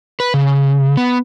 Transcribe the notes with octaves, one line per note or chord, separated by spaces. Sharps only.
B4
C#3
B3